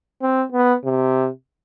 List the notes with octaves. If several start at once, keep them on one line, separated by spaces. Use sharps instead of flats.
C4
B3
C3